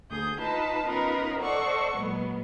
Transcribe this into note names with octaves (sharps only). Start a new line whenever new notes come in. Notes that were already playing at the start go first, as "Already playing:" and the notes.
D2 G#4 D#6 G6
D#4 F4 B4 A5
B3 C#4 D#4 F4 A#4 B4
A4 C5 D5 D#5 F#5 C#6
A#2 F#3 G#3 B3